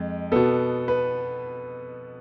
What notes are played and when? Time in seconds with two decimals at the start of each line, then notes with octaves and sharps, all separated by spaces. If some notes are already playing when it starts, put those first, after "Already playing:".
Already playing: F2 G#3
0.32 B2 B3 A4
0.88 B4